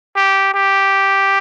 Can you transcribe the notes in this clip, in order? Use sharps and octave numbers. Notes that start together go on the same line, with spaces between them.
G4
G4